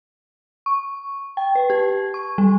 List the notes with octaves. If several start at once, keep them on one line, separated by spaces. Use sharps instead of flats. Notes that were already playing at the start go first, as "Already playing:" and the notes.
C#6
G5
B4
G4
C#6
G3